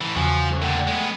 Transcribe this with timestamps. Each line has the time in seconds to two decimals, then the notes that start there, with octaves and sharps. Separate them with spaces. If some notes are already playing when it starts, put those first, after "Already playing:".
0.01 A2 E3
0.16 E2 C#3 F3 F#4 G#5
0.50 G3 C#4 A4
0.62 A#2 D3 A3 F#5 G5
0.87 G#3 B3